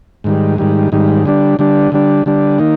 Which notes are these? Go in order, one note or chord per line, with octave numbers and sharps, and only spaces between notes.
G#2 D#3 G3
G#2 D#3 G3
G#2 D#3 G3
D3 G3 D4
D3 G3 D4
D3 G3 D4
D3 G3 D4
D#3 A#3 D#4